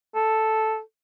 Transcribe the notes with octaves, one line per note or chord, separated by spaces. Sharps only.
A4